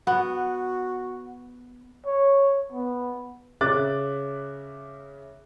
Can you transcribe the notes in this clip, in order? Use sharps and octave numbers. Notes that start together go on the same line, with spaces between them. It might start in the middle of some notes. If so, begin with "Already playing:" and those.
B3 F#4
C#5
B3
C#3 C#4 E5 D6 F#6 A6